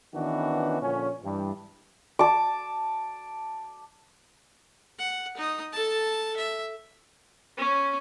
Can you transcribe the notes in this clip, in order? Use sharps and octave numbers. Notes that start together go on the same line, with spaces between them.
D#3 E3 B3 C#4 D4 F#4
A#2 D3 F3 C#4
G2 E3 G3
A5 D6
F#5
D#4 D#6
A4 A5
E5
C#4